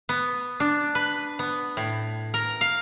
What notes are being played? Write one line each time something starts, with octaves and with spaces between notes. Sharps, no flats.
B3
D4
B4
B3
A2
A#4
F5